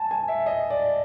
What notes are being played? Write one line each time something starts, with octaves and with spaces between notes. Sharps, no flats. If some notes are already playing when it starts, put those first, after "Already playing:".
Already playing: G#5 A5
G#5
E5
D#5
D5